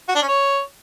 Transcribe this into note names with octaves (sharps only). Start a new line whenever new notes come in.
F#4
D4
C#4
C#5